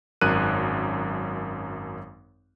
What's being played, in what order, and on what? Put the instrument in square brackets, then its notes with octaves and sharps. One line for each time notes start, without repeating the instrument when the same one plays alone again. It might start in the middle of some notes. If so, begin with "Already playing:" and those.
[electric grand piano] G#1 F#2 A#4 F#6 D#7